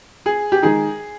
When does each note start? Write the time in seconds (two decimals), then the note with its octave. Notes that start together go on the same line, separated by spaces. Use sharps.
0.26 G#4
0.52 G4
0.62 D#3 G#3 D#4 G#4